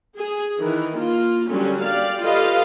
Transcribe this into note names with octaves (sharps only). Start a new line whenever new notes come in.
G#4
D#3 E3
A#3 F4
D3 F#3 G3 A#3 C#4
G4 D5 F5
F4 G4 A4 B4 D#5 F5